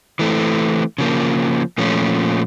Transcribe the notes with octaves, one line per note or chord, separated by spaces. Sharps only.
E3 A3 C4
C#3 F3 A#3
A#2 F3 A3 C#4